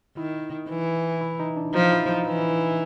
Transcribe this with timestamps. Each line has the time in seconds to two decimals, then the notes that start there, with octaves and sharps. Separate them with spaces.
0.17 D#3 E4
0.69 E3
1.21 E4
1.40 D#4
1.57 D4
1.74 F3 D#4
1.92 E4
2.09 D#4
2.27 E3